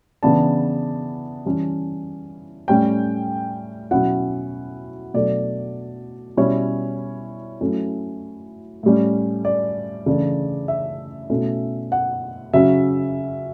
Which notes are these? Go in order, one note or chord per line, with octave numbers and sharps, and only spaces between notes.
C#3 E3 B3 D4 A5
E3 G3 C#4 E4
A2 G3 C#4 G5
B2 F#3 C#4 E4 F#5
B2 F#3 A3 D4 D5
B2 G3 C#4 E4 C#5
F#3 A3 C#4 E4
A2 G3 C#4
D5
C#3 E3 A3 D4
E5
B2 A3 C#4 E4
F#5
C#3 F#3 C#4 E5